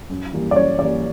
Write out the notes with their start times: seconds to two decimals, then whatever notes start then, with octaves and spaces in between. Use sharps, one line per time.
0.10 F#2
0.33 E3 G3 A#3
0.51 D5
0.56 F#2 C#5
0.79 E3 G3 A#3 D5